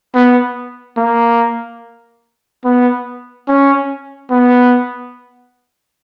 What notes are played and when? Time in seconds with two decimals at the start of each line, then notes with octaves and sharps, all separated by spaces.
0.15 B3
0.97 A#3
2.64 B3
3.48 C#4
4.31 B3